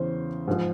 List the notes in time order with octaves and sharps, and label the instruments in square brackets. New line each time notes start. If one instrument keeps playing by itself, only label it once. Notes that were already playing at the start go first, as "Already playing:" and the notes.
Already playing: [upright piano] E2 C#3 E3 C5
G#2 F3